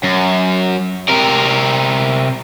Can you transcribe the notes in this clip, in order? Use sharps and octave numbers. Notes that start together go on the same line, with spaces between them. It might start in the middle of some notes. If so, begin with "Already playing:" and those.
F#2
C3 A#4